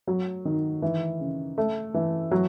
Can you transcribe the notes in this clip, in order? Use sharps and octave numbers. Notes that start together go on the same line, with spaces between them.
F#3
D#3
E3
C#3
A3
E3
F#3